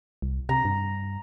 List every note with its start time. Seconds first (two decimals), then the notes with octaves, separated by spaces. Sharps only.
0.22 C2
0.49 C3 A#5
0.65 G2